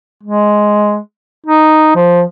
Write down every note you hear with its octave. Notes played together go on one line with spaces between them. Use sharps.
G#3
D#4
F3